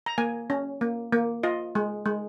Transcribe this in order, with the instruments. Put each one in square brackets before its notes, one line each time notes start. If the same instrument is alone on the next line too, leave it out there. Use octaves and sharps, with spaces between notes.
[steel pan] A#5
A#3 G#5
C#4
A#3
A#3
F4 D#5
G#3
G#3